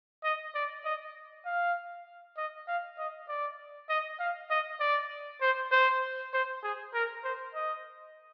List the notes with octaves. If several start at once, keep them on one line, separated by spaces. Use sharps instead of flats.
D#5
D5
D#5
F5
D#5
F5
D#5
D5
D#5
F5
D#5
D5
C5
C5
C5
G#4
A#4
C5
D#5